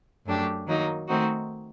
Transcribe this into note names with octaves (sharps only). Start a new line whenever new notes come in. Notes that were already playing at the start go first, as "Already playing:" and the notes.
F#2 F#3 A3 D4 G4
D#3 F#3 A#3 D#4
D#3 A3 C4 D#4 F#4